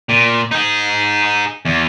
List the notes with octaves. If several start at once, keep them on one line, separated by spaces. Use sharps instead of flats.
A#2
D#4 G#4
E2